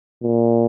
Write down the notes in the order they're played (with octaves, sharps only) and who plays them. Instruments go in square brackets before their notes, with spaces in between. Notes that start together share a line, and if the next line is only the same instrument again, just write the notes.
[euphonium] A#2